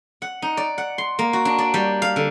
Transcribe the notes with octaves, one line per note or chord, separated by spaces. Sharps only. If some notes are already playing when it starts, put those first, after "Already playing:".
F#5
D#4
D5
F#5
C6
A#3
F#4
D4
D5
G3
F5
D3